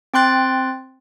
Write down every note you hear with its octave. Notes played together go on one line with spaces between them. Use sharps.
C4 G5 C6 F#6 A6